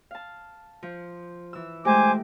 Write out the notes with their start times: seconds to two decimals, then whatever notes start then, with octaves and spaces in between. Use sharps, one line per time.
0.11 F5 A5
0.83 F3
1.53 E3 E6
1.85 G#3 A3 G4 C5 G#5 D6